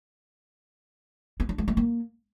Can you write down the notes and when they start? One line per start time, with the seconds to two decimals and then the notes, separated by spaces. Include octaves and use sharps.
1.40 B3
1.49 D4
1.58 G#3
1.68 A3
1.77 A#3